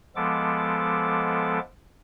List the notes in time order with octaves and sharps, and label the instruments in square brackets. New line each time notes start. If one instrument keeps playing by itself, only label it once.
[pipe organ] F3 G#3 B3 A4 D6